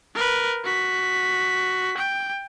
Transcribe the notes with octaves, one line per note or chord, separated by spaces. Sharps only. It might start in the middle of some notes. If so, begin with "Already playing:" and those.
A#4 B4
F#4 B6
G5